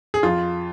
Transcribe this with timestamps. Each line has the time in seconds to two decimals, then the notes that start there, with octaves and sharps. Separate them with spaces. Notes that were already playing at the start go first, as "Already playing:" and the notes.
0.14 G#4
0.23 F2 F4